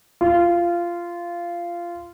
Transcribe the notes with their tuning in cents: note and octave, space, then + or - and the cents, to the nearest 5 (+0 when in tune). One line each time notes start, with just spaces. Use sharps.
F4 -15